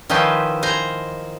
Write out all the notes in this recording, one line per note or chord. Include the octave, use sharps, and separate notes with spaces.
D#3 F3 C#4 E4 B4 C5
C5 G#5 A#5